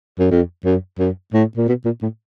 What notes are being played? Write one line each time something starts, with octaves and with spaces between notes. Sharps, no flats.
F#2
F2
F#2
F#2
A2
A#2
B2
A#2
A2